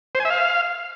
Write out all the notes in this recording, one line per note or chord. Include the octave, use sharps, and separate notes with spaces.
C5
G#5
E5
F5